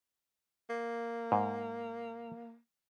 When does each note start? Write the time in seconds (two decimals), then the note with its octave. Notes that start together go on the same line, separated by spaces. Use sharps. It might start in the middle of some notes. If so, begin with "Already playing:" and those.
0.70 A#3
1.32 G#2